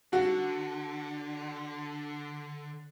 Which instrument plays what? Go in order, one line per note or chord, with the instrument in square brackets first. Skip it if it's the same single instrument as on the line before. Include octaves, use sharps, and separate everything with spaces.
[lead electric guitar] D3 [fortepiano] F#4